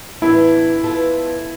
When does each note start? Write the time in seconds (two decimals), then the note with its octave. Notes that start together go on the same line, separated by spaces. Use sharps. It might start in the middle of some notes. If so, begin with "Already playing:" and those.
0.22 A2 E3 B3 D4 E4
0.83 B2 B3 F4 A4